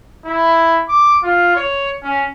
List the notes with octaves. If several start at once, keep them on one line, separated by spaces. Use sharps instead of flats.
E4
D6
F4
C#5
C#4